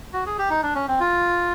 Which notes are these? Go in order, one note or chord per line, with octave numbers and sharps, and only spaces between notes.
F#4
G#4
G4
D#4
D4
C#4
C4
F4